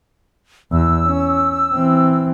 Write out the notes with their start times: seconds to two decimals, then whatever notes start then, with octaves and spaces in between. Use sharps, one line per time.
0.72 E2 E6
1.06 C#4
1.74 E3 C4